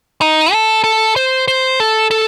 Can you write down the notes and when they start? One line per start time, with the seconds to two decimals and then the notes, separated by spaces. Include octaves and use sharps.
0.21 D#4
0.53 A4
0.84 A4
1.16 C5
1.48 C5
1.80 A4
2.11 A4